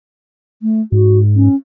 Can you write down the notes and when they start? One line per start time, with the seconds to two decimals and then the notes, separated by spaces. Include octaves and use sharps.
0.62 A3
0.92 G#2 F#4
1.36 C#4